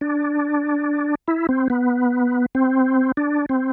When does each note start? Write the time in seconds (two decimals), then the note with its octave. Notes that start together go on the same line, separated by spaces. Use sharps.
0.01 D4
1.28 E4
1.49 C4
1.70 B3
2.55 C4
3.17 D4
3.49 C4